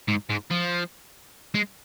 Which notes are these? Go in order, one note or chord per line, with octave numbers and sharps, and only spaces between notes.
G#2
G#2
F3
G#3